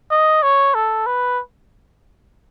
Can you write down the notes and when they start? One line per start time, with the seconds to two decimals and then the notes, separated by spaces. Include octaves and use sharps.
0.11 D#5
0.43 C#5
0.75 A4
1.06 B4